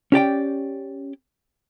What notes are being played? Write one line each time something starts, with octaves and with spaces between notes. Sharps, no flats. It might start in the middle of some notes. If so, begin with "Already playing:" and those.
C#4 G4 D5 G5